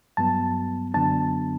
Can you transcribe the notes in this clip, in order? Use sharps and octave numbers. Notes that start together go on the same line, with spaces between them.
G2 F#3 B3 A5
F#2 D3 F#3 B3 D4 A5